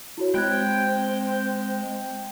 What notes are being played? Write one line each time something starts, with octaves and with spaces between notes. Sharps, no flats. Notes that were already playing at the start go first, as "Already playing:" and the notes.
E4 F#4 C#5
G#3 C4 G5 B5 F#6 G#6